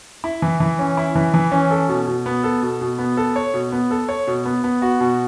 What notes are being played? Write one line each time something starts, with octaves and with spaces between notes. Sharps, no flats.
E4
E3
E3
C#4
E4
E3
E3
C#4
A4
B2
B2
B3
A4
B2
B2
B3
A4
C#5
B2
B3
A4
C#5
B2
B3
B3
F#4
B2